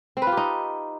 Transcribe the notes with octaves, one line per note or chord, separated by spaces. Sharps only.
C4
B4
F4
G4
D#4